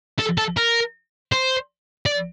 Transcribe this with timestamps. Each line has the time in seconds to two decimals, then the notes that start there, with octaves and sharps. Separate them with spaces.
0.19 A4
0.38 A4
0.57 A#4
1.32 C5
2.06 D5